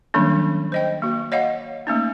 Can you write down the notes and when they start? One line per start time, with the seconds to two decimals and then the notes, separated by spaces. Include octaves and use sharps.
0.14 D#3 F#3 G3 A#3 C#4 D4
0.72 C5 D#5 G5
1.02 A#3 F#4
1.32 C#5 D#5 F5 F#5
1.87 A3 A#3 C#4 D#4